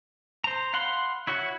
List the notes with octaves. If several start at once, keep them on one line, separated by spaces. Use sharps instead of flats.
C5 A#5
F5 F#5 B5 C6
E4 F#4 C#5 F#5